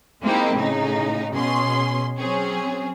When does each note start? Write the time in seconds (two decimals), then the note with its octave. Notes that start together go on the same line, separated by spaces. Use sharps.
0.22 G#3 A#3 C4 D#4 E4 G4
0.55 A2 C#3 D#4
1.34 B2 C#4 G#4 C6
2.19 F#3 C4 C#4 G#4